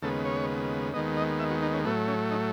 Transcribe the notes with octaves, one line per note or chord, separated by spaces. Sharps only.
D#2 C#3 G#3 B3 A4
C#5
D#2 D#3 G#3 B3 D#5
D#5
E5
F#4
D#4
C#4
A2 F#3 A3 B3
C#4
D#4